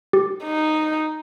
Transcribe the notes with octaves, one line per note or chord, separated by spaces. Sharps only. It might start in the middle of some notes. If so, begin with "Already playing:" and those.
G4
D#4